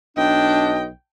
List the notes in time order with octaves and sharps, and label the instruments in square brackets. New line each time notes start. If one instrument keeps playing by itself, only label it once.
[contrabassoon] B1 [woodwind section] D4 [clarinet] D#5 [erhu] G5